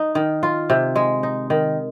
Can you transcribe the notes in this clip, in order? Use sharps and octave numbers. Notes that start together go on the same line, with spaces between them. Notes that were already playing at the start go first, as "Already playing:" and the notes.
Already playing: D#4
D#3
F4
C3
G#3
D#4
D#3